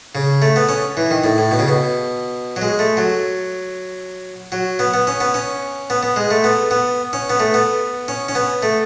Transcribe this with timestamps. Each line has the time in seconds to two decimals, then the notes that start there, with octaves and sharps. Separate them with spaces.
0.15 C#3
0.42 A3
0.56 B3
0.69 C#4
0.97 E3
1.11 D#3
1.24 A2
1.38 A2
1.51 B2
1.59 C#3
1.68 B2
2.56 F#3
2.62 G#3
2.79 A3
2.97 F#3
4.52 F#3
4.79 B3
4.94 B3
5.07 C#4
5.21 B3
5.34 C#4
5.90 B3
6.03 B3
6.16 G#3
6.31 A3
6.44 B3
6.71 B3
7.13 C#4
7.30 B3
7.40 A3
7.54 B3
8.08 C#4
8.29 C#4
8.35 B3
8.63 A3